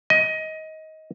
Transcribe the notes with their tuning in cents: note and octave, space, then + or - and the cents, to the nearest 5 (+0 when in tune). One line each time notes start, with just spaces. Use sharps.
D#5 +20